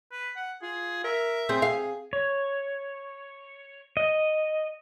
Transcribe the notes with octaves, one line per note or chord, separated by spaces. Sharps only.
B4
F#5
F4 G#4
A#4 E5
C4 G#4
G#4 F5
C#5
D#5